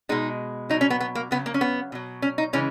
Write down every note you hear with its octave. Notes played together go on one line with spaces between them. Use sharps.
B2 G#3 D#4
B2 F#3 D#4
C#4
B3
B3
A#3
C#3 F#3 B3
A#3
C#4
B3
B2 F#3
C#4
D#4
C#3 E3 G#3 C#4